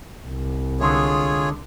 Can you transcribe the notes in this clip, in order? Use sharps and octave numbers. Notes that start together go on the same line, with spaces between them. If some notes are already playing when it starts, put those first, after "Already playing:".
C2
D3 G#3 F4 G#4 C#5